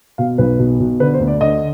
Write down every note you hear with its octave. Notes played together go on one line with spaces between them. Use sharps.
B2 F5
B1 B4
B2
B2
D3 B4
C5
D2
D5
D3 D#5